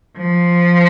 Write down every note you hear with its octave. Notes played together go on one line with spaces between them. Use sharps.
F3